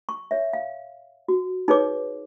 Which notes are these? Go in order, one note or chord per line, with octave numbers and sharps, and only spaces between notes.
C#6
C#5 E5
F5
F#4
D#4 G#4 B4 C#5 D6